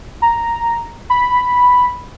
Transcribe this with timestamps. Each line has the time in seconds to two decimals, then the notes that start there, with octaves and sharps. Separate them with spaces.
0.22 A#5
1.10 B5